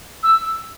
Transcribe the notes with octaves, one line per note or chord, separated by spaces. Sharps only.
E6